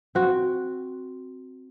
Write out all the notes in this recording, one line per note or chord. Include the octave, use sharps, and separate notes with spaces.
C4 F#4